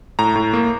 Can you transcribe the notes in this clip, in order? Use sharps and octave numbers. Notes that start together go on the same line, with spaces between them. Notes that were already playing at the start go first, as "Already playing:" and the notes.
A2 A#5
A2
A#3